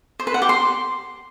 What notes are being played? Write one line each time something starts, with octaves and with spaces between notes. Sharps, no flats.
C5
B4
F#5
G4
C6